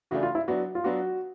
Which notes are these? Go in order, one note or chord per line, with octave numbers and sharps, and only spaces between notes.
C#3 E3 A3 D4 F#4
F4
E4
F#3 B3 D4 F#4
F4
F#3 B3 D4 F#4